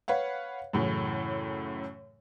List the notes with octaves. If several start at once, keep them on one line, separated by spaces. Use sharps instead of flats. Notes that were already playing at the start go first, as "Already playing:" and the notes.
B4 C#5 F5 F#5
F#2 A2 C#3 E3